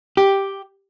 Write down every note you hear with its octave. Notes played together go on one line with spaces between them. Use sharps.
G4